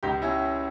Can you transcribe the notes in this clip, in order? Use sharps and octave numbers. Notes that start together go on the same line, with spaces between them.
C#2 D#4 G4
C#4 E4